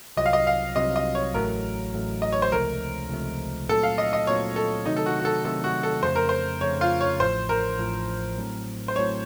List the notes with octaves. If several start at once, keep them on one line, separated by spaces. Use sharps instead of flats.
C2 C3 F#3 C4 F4 D#5
F5
D#5
F5
C2 C3 F#3 C4 F4 D#5
D#5
C#5
A1 A2 F#3 A3 A#4
A1 A2 F#3 A3
D#5
C#5
C5
C#2 C3 F3 A3 A#4
C#2 C3 F3 A3
A#2 F#3 A3 C4 F4 A4
F5
D#5
D#5
A#2 F#3 A3 C4 F4 C#5
A4
C3 D#3 F#3 A3 D#4
A4
F#4
F#4
A4
C3 D#3 F#3 A3 A4
F#4
A4
F2 C#3 A3 C#4 C5
A#4
C5
F2 C#3 A3 C#4 C#5
F4
C#5
A1 A2 F3 C5
A#4
A1 A2 F3
A2 F#3 C4
C5
A2 F#3 C4 C#5